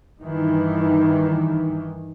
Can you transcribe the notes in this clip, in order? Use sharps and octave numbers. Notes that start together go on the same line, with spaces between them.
G2 D#3 E3